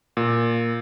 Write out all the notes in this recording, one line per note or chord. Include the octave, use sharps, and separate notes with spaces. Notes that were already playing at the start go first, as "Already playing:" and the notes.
A#2